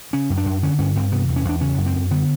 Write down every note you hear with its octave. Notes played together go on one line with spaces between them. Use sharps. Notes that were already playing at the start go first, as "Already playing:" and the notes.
C#3 C#4
F#2
D4
F#2
D3 C#4
G2 C#4
G2 C4
C3 B3
E2
C#4
E2 D4
C#3 C#4
F#2
C4
F#2
D3 B3